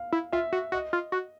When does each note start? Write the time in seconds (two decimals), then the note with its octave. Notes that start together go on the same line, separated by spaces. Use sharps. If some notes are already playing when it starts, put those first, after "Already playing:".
Already playing: F5
0.13 E4
0.33 F4 E5
0.52 F#4
0.72 F#4 D#5
0.93 F4
1.12 F#4